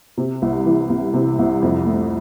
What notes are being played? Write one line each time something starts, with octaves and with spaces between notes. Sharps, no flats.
C3
C2
E3
C2
C3
C2
F2
A3